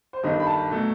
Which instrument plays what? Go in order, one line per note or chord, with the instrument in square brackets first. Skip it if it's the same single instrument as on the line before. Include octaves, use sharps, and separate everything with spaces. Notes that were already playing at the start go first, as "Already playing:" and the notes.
[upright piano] C5
G1 G2 D#3 D#5
B5
A5
B2 F#3 A3